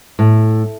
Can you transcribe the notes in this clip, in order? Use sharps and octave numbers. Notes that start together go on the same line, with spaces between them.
A2